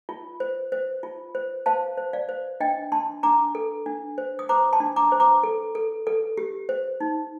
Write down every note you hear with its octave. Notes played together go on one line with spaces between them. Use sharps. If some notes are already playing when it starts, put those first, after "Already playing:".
F4
C5
C5
F4
C5
C5 F5 A5
C5
D5 F5
C5
D4 D#5 G5
D4 A5 C6
D4 A#5 D6
A4
D4
C5
D#6
C5 A#5 D6
A5 C6
D4
A#5 D6
C5
A#5 D6
A4
A4
A4
G4
C5
D#4